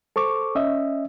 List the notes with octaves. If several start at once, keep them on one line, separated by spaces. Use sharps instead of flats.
A4 C5 C#6 D6
C#4 D#5 E5